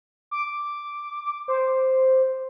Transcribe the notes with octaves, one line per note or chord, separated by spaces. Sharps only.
D6
C5